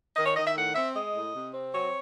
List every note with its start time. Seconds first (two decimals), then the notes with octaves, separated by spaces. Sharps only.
0.16 D#3 D#5
0.26 C#5
0.36 D#3 D#5
0.46 E5
0.55 A2 F#5
0.75 C4 E5
0.95 G#3 D#5
1.14 A2
1.33 C3
1.54 C4
1.73 F#3 C#5